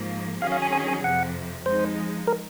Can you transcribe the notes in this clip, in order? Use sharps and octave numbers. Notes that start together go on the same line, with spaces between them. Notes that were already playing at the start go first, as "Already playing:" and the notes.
Already playing: G#2 F3 A#3
D#3 F#3 C#4 G#4 F5
F5
G#5
G#5
G#5
F2 C3 F3 F#5
F3 G#3 D#4 C5
A#4